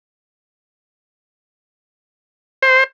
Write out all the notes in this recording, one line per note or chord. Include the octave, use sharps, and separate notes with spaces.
C5